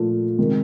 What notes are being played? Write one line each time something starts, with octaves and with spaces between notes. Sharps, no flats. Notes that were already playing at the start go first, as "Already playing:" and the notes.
Already playing: A#2 F3 A3
C3 D#3 G#3